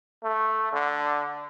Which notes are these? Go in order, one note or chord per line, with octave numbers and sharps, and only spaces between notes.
A3
D3